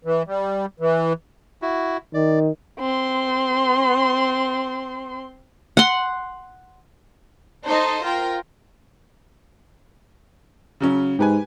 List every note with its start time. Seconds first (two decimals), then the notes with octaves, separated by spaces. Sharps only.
0.05 E3
0.27 G3
0.80 E3
1.62 E4 F#4
2.14 D#3 D5
2.79 C4 C6
5.77 F#5 C6
7.66 D#4 A4 C5 D#5
8.03 F4 A#4 G5
10.80 C#3 F#3 C#4
11.19 G#2 G4 B4 G#5